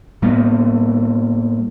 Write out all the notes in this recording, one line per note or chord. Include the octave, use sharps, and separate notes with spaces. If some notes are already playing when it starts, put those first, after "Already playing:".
A2 G3 A#3 B3